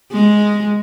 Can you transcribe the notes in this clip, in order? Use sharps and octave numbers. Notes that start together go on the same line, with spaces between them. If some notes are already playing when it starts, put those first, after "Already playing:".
G#3